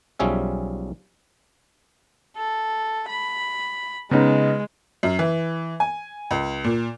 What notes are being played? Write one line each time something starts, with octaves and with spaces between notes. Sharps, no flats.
B1 F3 G3 C#4 G#4 E5
A4
B5
C#3 G#3 B3 D#4
F#2
E3
G#5
C#2
A#2